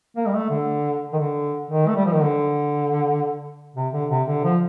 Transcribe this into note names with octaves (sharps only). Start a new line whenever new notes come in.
A#3
G3
A3
D3
D#3
D3
D#3
A3
G3
F3
D#3
D3
C3
D3
C3
D3
F3